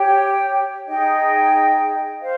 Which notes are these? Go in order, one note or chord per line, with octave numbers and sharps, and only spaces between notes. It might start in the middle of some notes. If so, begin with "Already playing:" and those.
Already playing: G4 C#5 G5
D#4 G#4 D#5 G5
C5 F5